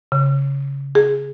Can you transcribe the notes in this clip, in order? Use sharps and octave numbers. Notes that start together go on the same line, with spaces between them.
C#3
G#4